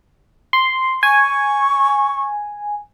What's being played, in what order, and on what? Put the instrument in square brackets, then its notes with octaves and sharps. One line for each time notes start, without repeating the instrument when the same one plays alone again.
[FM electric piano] C6
[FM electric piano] G#5 [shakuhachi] C#6